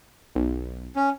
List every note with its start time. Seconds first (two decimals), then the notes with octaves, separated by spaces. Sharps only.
0.35 B1
0.96 C#4